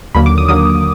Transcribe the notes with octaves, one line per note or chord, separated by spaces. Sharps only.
D#2 D3 F#3 A#3 B5
D6
D#6
D#2 D3 F#3 A#3 D#6